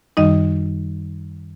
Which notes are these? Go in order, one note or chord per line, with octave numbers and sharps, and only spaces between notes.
F#2 D#3 G3 D#4 D#5